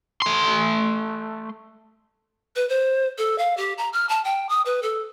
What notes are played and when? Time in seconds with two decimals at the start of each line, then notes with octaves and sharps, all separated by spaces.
0.22 A3 C6
2.56 B4
2.69 C5
3.18 A4
3.38 F5
3.57 G4
3.78 A#5
3.93 F6
4.09 A5
4.25 G5
4.49 D#6
4.66 B4
4.83 A4